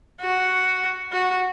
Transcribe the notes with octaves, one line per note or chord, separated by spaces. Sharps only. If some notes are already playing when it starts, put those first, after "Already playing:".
F#4
F#4